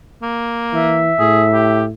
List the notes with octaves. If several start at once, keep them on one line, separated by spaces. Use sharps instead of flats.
A#3
E3 E5
A2 G#4
G4